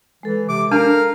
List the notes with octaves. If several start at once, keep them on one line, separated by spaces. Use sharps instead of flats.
E3 G#3 A4
C3 D6
D4 A#4 F5 A5